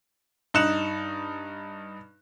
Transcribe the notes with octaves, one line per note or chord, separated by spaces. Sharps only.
G2 D#4 F#6 C#7 E7